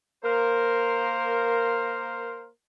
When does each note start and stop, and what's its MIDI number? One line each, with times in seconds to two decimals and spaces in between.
0.23 2.46 58
0.23 2.46 70
0.23 2.46 72